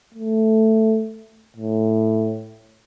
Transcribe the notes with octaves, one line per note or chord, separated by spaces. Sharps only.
A3
A2